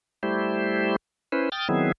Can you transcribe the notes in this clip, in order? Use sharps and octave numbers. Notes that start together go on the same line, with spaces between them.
G3 A3 E4 G4 C5
C#4 E4 B4 C5
G5 D#6 F6 A6
D#3 F#3 B3 C4 E4 G#4